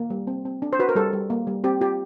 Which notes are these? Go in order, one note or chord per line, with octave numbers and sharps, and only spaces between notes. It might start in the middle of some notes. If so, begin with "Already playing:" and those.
Already playing: A#3
G3
C4
C4
D4
C5
F#4 B4
A#4
G3 A4
G3
A#3
G3
C4 G4
F4 G4